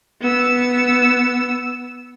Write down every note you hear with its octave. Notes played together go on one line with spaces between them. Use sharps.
B3 E6